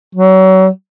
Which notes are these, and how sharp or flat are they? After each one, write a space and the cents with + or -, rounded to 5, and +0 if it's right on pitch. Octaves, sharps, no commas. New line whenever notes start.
F#3 +30